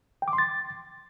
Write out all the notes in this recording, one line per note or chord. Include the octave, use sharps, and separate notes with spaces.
G5
D6
C6
A6